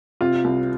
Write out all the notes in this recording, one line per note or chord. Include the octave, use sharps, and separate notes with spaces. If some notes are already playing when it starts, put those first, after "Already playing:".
C3 F4
C2